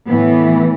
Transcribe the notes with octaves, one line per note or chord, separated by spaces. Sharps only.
A2 E3 B3